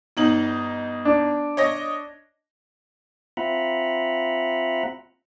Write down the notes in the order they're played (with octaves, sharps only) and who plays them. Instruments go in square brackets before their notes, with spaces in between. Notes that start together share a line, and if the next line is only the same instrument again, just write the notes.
[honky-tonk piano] G1 D#4 F#7
[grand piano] D4
[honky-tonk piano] C#5 D#5 A#6
[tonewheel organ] C4 F4 E5 F#5 A#5 B5